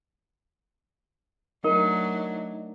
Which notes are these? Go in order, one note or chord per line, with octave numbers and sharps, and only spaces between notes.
F#3 A3 D4 D#4 A#4